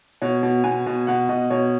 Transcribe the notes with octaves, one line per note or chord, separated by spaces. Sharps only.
B2 C#5
B2
B2 G#5
B2
B2 F#5
B2 D#5
B2 C#5